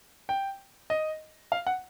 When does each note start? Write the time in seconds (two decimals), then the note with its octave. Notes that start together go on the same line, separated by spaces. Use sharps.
0.29 G5
0.90 D#5
1.52 F5
1.67 F#5